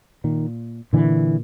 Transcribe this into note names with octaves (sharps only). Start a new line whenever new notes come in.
A#2 D#3
A#2 D3 E3